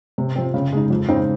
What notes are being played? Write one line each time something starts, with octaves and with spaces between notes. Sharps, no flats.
C3
F3 C4
C#3
G#3 D#4
F2
C#3 G#3 C4 D#4